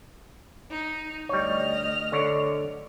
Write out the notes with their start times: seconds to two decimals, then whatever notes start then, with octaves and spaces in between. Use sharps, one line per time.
0.70 D#4
1.29 D2 G3 C#5 D#5 F6
2.12 D3 C#5 D5